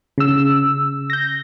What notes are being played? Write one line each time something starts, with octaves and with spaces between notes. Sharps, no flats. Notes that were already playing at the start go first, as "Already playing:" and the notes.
C#3 E6
G6 A#6